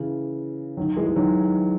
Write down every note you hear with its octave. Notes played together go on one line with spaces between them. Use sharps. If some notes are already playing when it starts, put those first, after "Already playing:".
Already playing: C#3 E3
D#3 F#3
E3 G#3
G#3
D#3 F#3